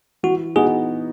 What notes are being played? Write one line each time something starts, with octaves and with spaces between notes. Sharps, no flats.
E3 F#4
B3 D#4 F#4 G#4